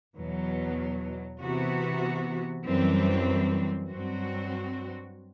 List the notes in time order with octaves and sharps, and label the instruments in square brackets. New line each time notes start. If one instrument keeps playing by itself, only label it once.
[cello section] E2 B2 F#3
C3 E3 B3 F#4
F#2 E3 G3 C4
G2 F#3 C4 F#4